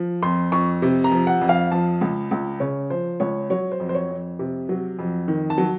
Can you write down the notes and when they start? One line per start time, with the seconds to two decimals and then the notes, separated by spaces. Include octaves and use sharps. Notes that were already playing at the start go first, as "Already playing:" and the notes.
Already playing: F3
0.22 F2 C6
0.52 F2 C#6
0.82 C3
1.04 A#5
1.12 F3
1.27 F#5
1.41 F2
1.49 F5
1.71 F3 A5
2.01 C#2
2.31 C#2
2.60 C#3 C#5
2.90 F3 C5
3.20 C#2 C#5
3.50 F#3 C#5
3.72 C5
3.80 F2
3.89 C5
3.95 C#5
4.10 F2
4.39 C3
4.69 F#3
4.99 F2
5.28 D#3
5.50 A5
5.58 F#3